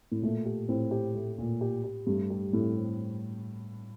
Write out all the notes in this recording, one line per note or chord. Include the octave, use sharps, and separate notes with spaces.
A2
A#2 A3
G4
A2 C4
G4
A3
A#2
G4
G4
G2 A3
G4
A2 A3
C4